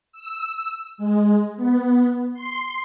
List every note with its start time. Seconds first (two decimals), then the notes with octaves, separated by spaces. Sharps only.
0.12 E6
0.98 G#3
1.57 B3
2.34 C6